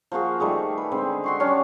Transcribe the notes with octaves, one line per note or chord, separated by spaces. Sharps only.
F3 A#3 F#4 G#4
D#3 G3 A3 G#4
B4
D3 G#3 C4
F#4 C6 C#6
F#3 C#4 D4 G4